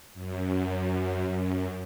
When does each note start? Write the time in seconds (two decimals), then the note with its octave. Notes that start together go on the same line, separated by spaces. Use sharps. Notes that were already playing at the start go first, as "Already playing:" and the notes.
0.14 F#2
1.27 F#2